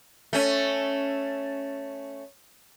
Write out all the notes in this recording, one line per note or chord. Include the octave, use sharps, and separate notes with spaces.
A3 C#4